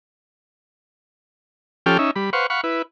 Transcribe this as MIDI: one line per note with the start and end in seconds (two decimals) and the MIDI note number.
1.86 1.98 53
1.86 1.98 61
1.86 1.98 67
1.86 1.98 69
1.86 1.98 79
1.86 1.98 89
1.99 2.11 61
1.99 2.11 63
1.99 2.11 76
2.16 2.30 55
2.16 2.30 83
2.33 2.47 71
2.33 2.47 72
2.33 2.47 77
2.33 2.47 78
2.33 2.47 85
2.50 2.61 77
2.50 2.61 78
2.50 2.61 83
2.50 2.61 85
2.64 2.82 64
2.64 2.82 71